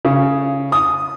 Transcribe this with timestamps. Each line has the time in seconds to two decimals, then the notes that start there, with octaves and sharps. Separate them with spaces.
0.05 C#3
0.72 D#6